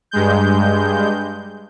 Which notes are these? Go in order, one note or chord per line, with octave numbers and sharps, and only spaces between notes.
G2 G#3 G6